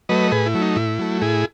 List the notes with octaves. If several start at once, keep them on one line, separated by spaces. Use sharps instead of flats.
F#3 A3 B4 D#5
A2 G#4 B4
E4
F#3 A3
D#4
A2 E4
F#3 A3
A2 E4 G#4